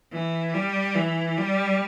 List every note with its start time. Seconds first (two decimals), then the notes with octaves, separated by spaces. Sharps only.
0.12 E3
0.54 G3
0.95 E3
1.37 G3